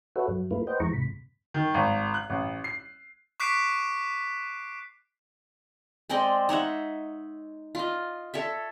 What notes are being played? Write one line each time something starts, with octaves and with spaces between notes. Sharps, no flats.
F#4 A4 B4 C#5 E5 F#5
G2 F#3
A3 A#3 E4 F4 A#4 B4
B4 C5 D#5 F#5 G5
F2 E3 G#3 E4 A#5 C#6
G#2 C3 B5
D#3
G#1
F#6
A1
C7
C#6 D6 F#6 B6 C7 D7
G#3 C4 D5 D#5
D#4 C#5 E5 F#5
F4 D#5
A4 C#5 E5